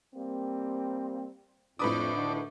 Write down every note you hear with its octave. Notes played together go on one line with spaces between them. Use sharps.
G3 A#3 C4
F2 A2 D4 B4 D6 D#6
D2 D3 D#3